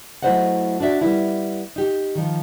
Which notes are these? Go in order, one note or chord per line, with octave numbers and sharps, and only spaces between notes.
F#3 A3 E4 C5 D#5 F#5
D4 F#4 D5 E5
G3 B3 E4
D#4 G4
D#3 F3